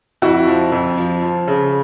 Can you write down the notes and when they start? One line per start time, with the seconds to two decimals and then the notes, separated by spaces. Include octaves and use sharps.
0.22 F2 E4 F#4
0.47 F3
0.72 F2
0.97 F3
1.22 F3
1.47 C#3